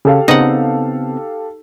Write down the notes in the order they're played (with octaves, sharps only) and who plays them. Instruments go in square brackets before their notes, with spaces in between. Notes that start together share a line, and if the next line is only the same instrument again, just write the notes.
[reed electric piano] C#3 [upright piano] G4 A4 F5
[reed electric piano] C#3 B3 C4 [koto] D#4 F#5